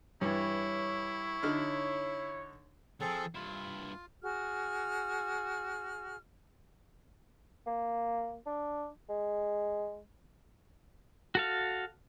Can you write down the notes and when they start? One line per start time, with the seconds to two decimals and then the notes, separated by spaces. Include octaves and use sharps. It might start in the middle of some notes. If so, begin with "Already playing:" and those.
0.21 G2 E3 E4 C#5
1.43 D3 D#4 F6
3.01 F3 F#3 C4 G#4 A4
3.35 G2 E4 F4
4.22 F#4 G#4 F6
7.66 A#3
8.46 D4
9.09 G#3
11.35 F#4 A4 F5